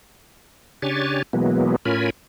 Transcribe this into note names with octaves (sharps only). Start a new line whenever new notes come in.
C#3 D4 G4 C#5 G#5 A6
B2 E3 F#3 G#3 A#3 B3
A2 C#4 F4 A#4 G#5 B5